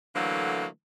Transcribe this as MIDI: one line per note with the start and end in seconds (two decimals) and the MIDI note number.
0.15 0.66 50
0.15 0.66 52
0.15 0.66 54
0.15 0.66 57
0.15 0.66 58